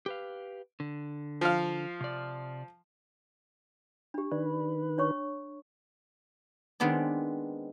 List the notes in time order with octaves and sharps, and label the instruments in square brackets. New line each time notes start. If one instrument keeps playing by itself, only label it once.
[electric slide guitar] G4 B4 F5
D3
[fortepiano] F3 F5
[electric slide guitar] C3 D5
[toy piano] D4 G4
[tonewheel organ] D#3 B4 [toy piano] D5
[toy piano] D4 C#5 C#6
[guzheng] D#3 G#3 B3 C4 D4